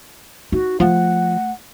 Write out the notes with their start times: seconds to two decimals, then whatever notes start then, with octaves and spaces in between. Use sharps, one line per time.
0.52 D#4 F#4
0.80 F3 A3 F#5